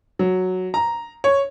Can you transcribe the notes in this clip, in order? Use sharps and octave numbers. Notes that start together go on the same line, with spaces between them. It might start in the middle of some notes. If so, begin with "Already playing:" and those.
F#3
A#5
C#5